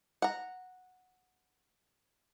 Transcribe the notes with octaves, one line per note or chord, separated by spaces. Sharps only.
F#5 A#5